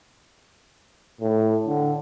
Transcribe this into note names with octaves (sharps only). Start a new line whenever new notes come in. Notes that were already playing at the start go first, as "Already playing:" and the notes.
A2
D3